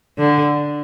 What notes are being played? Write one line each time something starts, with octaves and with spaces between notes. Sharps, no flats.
D3